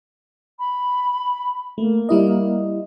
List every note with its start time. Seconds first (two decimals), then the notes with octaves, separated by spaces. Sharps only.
0.59 B5
1.78 A3 A#3
2.09 G3 E4 D#5